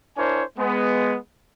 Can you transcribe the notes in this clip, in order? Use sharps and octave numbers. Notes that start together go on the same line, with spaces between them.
D4 E4 A#4 C5 C#5 G#5
G#3 B3